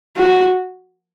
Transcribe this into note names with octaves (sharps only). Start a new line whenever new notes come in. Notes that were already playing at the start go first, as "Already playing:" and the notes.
F#4